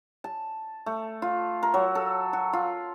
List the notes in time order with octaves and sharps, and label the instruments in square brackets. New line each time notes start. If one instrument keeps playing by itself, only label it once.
[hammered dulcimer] A5
A3
F4
A#4
F#3
A4
F#4
F4